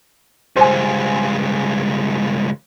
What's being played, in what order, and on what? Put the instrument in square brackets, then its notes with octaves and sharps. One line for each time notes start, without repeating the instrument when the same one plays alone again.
[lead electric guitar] C#2 G2 [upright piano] C5 G#5